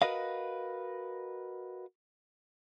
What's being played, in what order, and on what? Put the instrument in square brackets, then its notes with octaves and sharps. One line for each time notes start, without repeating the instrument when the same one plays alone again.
[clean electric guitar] F#4 A#4 B4 D#5 F5